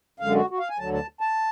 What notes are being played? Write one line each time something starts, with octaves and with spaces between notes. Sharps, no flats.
F#2 D3 G#3 F5
F#4
F#4
F5
G#5
D2 D3 F#3 A5
A5
A5